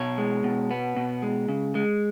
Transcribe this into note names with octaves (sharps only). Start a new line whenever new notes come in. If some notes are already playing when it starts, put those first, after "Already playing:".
Already playing: B2 C#5
G#3
B2
B3
B2
G#3
C#3
G#3